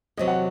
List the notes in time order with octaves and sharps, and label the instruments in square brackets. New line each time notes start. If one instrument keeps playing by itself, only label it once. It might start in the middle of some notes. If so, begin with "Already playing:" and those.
[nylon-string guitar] E2 C3 F#3 [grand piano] D#5
[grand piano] F#5